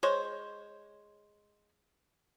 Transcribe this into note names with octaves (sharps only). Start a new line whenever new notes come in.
G#3 C5 C#5